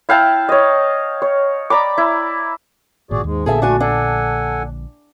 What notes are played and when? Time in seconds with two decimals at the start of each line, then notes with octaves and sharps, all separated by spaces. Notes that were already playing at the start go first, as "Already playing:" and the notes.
0.09 E4 F5 G5 A5
0.49 C#5 D#5
1.22 C#5
1.70 D5 A#5 B5 D6
1.98 E4
3.11 G#1 A#2 F#4 G#4 D5
3.24 D#2 G#2 G#3
3.46 A#1 A#2 D3 B3 G#4 A4 E5
3.62 A3 D4 F#4 G#5
3.80 D4 A4 F#5 G#5